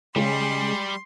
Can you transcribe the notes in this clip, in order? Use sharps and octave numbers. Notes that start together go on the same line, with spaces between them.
C#3 G3 G#3 C6